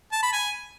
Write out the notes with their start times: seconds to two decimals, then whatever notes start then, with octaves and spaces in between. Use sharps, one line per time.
0.12 A5
0.22 B5
0.33 G#5